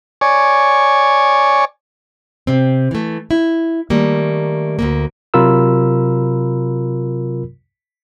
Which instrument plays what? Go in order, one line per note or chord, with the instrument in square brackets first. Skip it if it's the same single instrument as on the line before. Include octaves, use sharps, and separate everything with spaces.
[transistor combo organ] C#5 D5 G#5 C#6
[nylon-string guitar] C3 C4
E3 A3
E4
D#3 G3 A3 A#3
D2 G#2 A#3
[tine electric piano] C3 F#3 F4 A#4 B5 E6